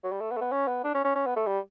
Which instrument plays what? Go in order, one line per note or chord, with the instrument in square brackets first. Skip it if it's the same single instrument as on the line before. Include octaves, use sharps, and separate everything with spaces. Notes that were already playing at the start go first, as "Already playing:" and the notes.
[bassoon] F#3
G3
A3
B3
A3
B3
C#4
B3
D4
C#4
C#4
C#4
B3
A3
G3